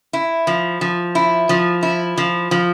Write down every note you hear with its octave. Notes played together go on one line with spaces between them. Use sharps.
E4
F3
F3
E4
F3
E4
F3
F3